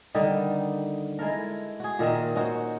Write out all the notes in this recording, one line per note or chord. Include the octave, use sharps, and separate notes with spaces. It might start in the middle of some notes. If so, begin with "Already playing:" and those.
D3 D#3 G3 D#4
G#3 E4 A4 A#4
F#4 G#4
A#2 D#3 A#4 E5
C#4 D#4 F#4 C5